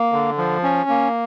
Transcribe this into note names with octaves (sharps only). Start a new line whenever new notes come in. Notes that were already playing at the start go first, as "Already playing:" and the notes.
Already playing: A#3
D3
F3
C#4
A#3